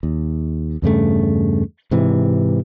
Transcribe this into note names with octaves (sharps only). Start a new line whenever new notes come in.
D#2
E2 G2 C#3 A3
G#2 C3 E3